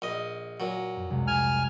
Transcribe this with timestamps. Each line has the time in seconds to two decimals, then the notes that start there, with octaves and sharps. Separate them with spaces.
0.02 A#1 D#5
0.60 A#2 F#3
0.96 F2
1.10 C2 C3 G#3
1.27 G#5 F6